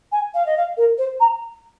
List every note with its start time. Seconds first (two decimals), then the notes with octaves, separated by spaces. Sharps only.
0.12 G#5
0.34 F5
0.46 D#5
0.57 F5
0.77 A#4
0.98 C5
1.20 A#5